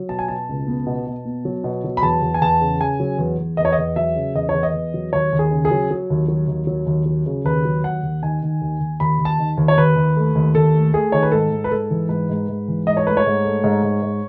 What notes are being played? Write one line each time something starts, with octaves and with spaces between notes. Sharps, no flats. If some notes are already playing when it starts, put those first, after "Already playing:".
Already playing: F#3
B2 A5
G#5
B2 A5
C#2
B3
B2
B2
B3
F#3
B2
F#3
B5
E2 A5
E2
G#5
E2 A5
C#3
C#3 G#5
F#3
E2
E2
E2 D#5
C#5
D#5
E2
F#3 E5
C#3
E2 D#5
C#5
E2
D#5
E2
F#3
D#2 C#5
D#2
G#4
C#3
G#4
F#3
F#3
D#2
F#3
D#2
F#3
D#2
F#3
C#3
D#2 B4
F#3
D#2 F#5
D#2
D#3 G#5
D#3
D#2
D#2
D#2 B5
D#2
A5
D#3
D#2
C#5
D#2 B4
D#2
A3
D#2
D#2 A4
A3
A3 G#4
D#3 C#5
B4
G#2 A4
G#2
B4
G#2 A4
E3
G#2 B4
G#2
G#2
E3
G#2 D#5
C#5
A3 B4
C#5
G#2
A3
G#2
G#2
G#2